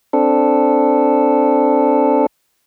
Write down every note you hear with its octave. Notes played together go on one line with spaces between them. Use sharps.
C4 D4 A4